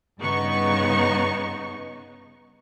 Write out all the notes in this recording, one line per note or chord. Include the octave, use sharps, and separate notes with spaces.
G2 C#3 B3 D#4 C#6